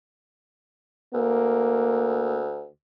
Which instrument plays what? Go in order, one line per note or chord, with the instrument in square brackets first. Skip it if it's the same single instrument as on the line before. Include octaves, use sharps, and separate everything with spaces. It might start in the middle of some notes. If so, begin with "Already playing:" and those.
[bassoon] D2 [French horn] A#3